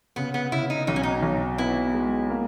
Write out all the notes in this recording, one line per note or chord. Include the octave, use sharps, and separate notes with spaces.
C#3 B3
B3
C#3 E4
D#4
B1 D#4
C#4
D#4
B1
B3 E4
G#3
A#3